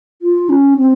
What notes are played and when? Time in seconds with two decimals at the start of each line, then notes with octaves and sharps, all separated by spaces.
0.22 F4
0.49 C#4
0.78 C4